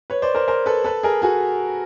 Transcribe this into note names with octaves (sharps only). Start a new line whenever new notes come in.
B4 C#5
C5 D5
A#4 C5
A#4 C5
A4 B4
A4 B4
G#4 A#4
F#4 G#4